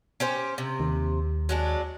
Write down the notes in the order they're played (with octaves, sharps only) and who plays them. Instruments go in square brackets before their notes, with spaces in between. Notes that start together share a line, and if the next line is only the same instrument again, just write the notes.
[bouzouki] C#4 G4 C5
C3
[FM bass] D#2
[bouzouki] F#3 G#3 D4